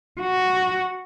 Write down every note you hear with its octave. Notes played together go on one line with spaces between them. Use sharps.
F#4